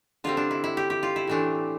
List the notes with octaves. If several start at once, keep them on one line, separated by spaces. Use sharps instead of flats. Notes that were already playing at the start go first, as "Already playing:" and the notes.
D3 G3 C4 F4
D4
E4
E4
G4
G4
F4
E4
A2 E3 A3 C4 D4